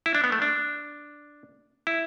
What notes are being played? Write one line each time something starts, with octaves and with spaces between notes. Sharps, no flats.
E4
D4
B3
A3
D4
E4